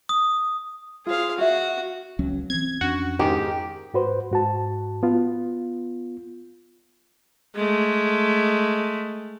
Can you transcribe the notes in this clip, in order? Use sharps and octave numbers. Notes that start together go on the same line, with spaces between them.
D#6
F4 G#4 C5 F5
F#4 E5 F5
C#2 F#3 C#4
E3 C4 G#6
F2 C#4 D4 F#4
G#2 D#3 G4
G#2 F#4 B4 C5
G#2 F#4 A5
B3 F4
G#3 A3